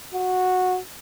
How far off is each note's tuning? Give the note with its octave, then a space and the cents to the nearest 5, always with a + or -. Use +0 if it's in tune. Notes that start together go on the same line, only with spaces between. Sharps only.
F#4 -10